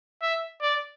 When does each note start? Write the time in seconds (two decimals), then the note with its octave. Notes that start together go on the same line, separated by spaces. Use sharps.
0.22 E5
0.62 D5